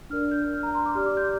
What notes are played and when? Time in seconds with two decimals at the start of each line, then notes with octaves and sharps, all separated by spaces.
0.10 D4 A#4 D5 F6
0.31 G6
0.53 F6
0.63 A#5
0.75 C6
0.86 D6
0.95 G4 D5 F6
1.06 D6
1.17 G6